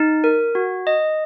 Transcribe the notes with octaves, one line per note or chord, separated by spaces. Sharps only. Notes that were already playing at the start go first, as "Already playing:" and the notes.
Already playing: D#4
A#4
F#4
D#5